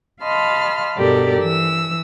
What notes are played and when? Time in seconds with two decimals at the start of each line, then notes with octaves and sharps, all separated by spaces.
0.23 D#5 F5 A5 B5 C6 F6
0.98 G2 B2 G4 A4 A#4 D5
1.42 E3 E6